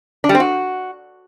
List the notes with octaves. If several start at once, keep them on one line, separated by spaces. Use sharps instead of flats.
D4
G3
C4
F#4